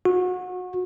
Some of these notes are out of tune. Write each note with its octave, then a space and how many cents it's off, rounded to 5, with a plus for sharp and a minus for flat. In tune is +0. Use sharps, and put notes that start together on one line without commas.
F#4 -30